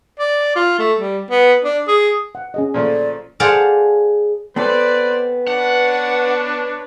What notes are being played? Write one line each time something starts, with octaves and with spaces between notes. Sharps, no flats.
D5
F4
A3
G3
B3
D4
G#4
F#5
C#4 G#4 D#5
A#2 F3 A3 D5
G#4 C5 D5 F5 F#5 A5
B3 C4 A4 B4 C5 D5
D4 B4 C#5 F#5